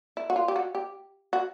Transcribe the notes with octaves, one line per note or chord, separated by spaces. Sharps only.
E4
F#4
F4
G4
F#4
G4
F#4